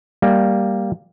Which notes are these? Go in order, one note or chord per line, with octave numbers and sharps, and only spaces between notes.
G3 A#3